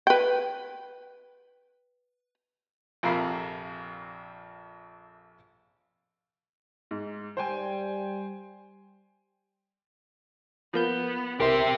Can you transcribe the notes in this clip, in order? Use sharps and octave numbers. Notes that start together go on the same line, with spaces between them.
B4 G5
A#1 F2 C3 A#4 F5 B5
G#2
G3 C5 G5 G#5
F3 A#3 B3 G6
C2 C4 G4 A#4 E5 C6